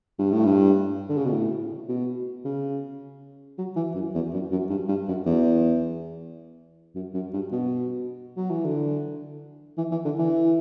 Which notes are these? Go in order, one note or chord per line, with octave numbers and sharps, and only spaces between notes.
G2
A2
G2
D3
C#3
B2
A2
B2
C#3
F#3
E3
F#2
E2
F#2
F#2
G2
G2
F#2
E2
F#2
F#2
G2
B2
F#3
E3
D3
E3
E3
D3
E3